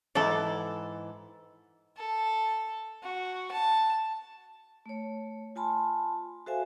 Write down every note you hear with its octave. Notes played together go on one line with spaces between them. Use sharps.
G#2 E3 A4 D5
A4
F#4
A5
A3 C#5
F4 G#5 A5 B5 C6
F#4 A4 C5 E5 F5 G#5